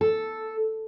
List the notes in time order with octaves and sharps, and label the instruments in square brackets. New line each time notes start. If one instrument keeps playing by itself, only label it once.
[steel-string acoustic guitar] A4